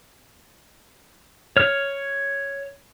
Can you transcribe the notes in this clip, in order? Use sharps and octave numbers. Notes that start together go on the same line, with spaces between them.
C#5 F6